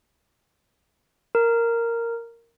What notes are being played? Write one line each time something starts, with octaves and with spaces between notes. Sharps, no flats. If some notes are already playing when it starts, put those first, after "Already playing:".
A#4